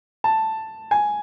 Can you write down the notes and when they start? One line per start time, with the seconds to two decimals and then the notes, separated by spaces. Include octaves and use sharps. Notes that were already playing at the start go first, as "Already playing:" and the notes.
0.24 A5
0.91 G#5